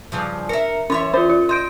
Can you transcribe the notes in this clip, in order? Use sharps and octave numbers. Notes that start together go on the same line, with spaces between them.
G2 C#3 F3
A#4 E5 C#7
E3 C#4 C#5 E5 C6
C#4 F4 C5
F4
D#5 C6 G6 D7